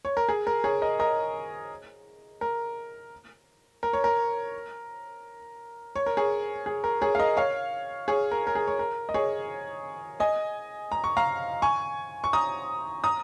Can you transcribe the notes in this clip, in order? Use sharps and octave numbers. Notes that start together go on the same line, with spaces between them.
C#5
A#4
G#4
A#4
G#4 C#5
A#4 D#5
A#4 D#5
A#4
A#4
C#5
A#4
C#5
A#4
G#4 C#5
G#4
A#4
G#4 C#5
F5
A#4 D#5
C#5 F5
G#4 C#5
A#4
A#4
G#4
C#5
A#4
D#5
G#4 C#5
D#5 G#5
A#5
C#6
F5 A#5
G#5 C#6
C#6
A#5 D#6
A#5 D#6